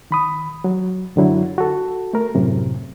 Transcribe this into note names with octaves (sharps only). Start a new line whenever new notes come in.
D#3 B5 D#6
F#3
F#2 D3 F#3 E4
F#4 A4
A3 A#4
F#2 A2 C3